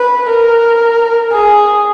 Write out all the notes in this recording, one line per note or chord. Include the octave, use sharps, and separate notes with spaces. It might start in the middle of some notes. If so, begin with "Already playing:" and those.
Already playing: B4
A#4
G#4